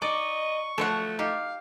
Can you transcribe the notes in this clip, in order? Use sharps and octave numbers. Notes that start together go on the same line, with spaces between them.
D#4 D5 D#5 C#6
F3 F#3 A3 A4 C5 F#5
D#4 G4 F5